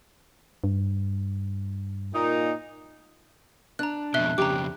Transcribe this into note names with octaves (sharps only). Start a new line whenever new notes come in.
G2
A#2 D#4
D4 A#5 F#6
F2 B2 E5 F#6 G7
F2 C#3 G4 A#5 D6